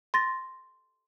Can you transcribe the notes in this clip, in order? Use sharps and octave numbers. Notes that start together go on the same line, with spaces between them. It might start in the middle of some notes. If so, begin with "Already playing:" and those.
C6 A6 A#6